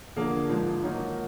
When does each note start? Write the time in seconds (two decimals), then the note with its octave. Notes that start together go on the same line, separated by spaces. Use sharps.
0.16 D3 F3 A#3 D4 G#4
0.49 G#2 F3 G#3 D#4
0.82 D#3 F#3 A#3 D#4